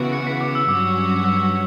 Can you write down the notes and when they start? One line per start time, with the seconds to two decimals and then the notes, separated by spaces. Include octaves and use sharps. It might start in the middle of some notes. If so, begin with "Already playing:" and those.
Already playing: C#3 E3 B3 F#4
0.13 C#7
0.27 B6
0.41 D6
0.55 E6
0.68 G2 F#3 C#4 F#4 D6
1.24 E6